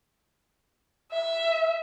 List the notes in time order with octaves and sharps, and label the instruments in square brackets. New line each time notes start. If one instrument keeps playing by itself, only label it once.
[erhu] E5